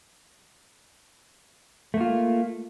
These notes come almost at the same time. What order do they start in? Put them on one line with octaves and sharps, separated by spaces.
A3 A#3 F4